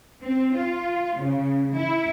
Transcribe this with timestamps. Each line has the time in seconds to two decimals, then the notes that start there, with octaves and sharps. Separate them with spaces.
0.22 C4
0.56 F4
1.19 C#3
1.74 E4